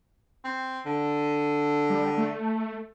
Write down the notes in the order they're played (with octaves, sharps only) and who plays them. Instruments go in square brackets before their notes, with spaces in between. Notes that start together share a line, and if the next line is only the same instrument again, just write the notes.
[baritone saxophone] C4
D3
[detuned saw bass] G3
A3